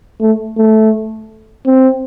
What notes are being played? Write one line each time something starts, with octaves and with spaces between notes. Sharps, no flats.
A3
A3
C4